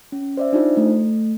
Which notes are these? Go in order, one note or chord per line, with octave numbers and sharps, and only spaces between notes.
C#4
C5 D5 E5
D4 D#4 F4 C5
A3